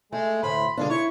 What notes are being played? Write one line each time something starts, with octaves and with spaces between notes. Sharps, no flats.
G#3 A3
D2 A2 B5 C6
D3 G#3 D4 F4
E4 C#5 C#6